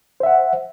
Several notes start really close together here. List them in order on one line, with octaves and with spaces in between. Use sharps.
C5 E5 F#5